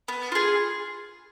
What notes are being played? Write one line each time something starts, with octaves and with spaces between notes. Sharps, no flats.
B3
F4 G#4